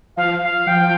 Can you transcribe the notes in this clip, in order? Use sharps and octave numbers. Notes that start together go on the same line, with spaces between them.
F3 F5
F5
F3 G5